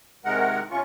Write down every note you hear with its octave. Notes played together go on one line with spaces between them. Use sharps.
C3 D#3 G#3 A#4 F#5
C3 C#4 F4 C#6